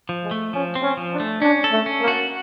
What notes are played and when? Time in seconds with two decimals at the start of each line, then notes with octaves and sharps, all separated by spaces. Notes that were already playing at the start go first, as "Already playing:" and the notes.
0.09 F3
0.23 G#3
0.31 A3
0.53 F3 C#4
0.75 C4
0.83 C#4
0.97 F3
1.12 D4
1.20 A3
1.42 C#4 D4
1.64 A4
1.72 A3
1.86 C#4
2.01 A#3
2.08 F#4